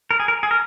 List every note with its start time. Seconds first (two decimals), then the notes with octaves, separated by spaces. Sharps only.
0.11 A#4
0.20 G#4
0.28 A#4
0.43 G#4
0.51 A#4